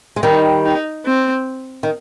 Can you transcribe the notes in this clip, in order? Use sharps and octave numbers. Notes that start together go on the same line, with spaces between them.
G#3
D#3 G3 D#4
D#4
C4
D#3